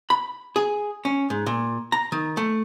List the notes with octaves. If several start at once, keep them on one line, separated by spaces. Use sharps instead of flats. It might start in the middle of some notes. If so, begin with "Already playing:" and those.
B5
G#4
C#4
G#2
A#2
A#5
D#3
A3